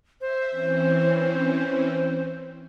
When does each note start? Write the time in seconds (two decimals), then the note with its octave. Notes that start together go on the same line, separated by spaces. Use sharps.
0.21 C5 E5
0.51 E3 C4 C#4